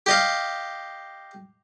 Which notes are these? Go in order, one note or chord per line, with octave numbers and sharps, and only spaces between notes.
G4 D#5 F5